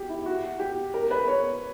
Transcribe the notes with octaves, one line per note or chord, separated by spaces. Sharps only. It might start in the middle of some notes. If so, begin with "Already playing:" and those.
Already playing: F#4 G4
E4
F#4
G4
A#4
B4
C#5